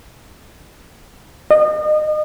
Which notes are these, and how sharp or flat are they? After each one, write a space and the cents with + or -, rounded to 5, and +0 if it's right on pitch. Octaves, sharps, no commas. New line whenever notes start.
D#5 -35